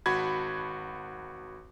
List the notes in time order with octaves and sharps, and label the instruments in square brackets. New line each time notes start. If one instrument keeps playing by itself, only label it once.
[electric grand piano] G#1 F#4 B5 G#6